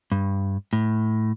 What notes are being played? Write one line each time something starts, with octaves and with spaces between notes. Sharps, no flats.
G2
A2